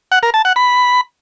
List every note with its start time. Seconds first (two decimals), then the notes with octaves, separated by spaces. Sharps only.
0.12 F#5
0.23 A#4
0.34 A5
0.45 F#5
0.56 B5